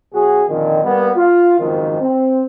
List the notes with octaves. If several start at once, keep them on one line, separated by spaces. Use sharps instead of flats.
B2 F#3 F#4 G#4
F2 A#2 D3 D#3
G3 A#3 B3
F4
F#1 F2 G#2 D#3
C4